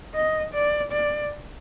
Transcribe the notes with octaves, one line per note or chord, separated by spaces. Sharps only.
D#5
D5
D5